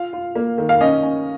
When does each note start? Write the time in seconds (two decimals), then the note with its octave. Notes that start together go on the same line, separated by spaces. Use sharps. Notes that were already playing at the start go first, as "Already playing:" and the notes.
Already playing: F4 F5
0.13 F4
0.35 A#3
0.58 D#3
0.69 F5
0.81 C#4 D#5
1.03 C#4